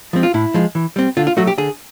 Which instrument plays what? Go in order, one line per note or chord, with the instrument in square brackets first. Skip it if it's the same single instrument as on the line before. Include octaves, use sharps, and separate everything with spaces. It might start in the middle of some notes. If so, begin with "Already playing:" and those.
[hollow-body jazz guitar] F3 G#3 C4
F4
A2 E4
F3 G#3
E3
G3 C4
D3 F4
F4
F#3 A3 F#4
G4
D3 G#4